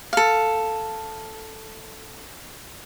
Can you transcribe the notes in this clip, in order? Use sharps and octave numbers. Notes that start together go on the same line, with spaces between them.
A4 F5